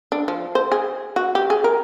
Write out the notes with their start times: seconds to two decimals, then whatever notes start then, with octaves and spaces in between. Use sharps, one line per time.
0.12 D4
0.28 F3
0.55 C5
0.72 G#4
1.16 F#4
1.35 G4
1.50 G#4
1.64 A#4